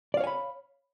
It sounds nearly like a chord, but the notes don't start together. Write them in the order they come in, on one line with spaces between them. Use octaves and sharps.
D5 F5 C#5 G#5 B5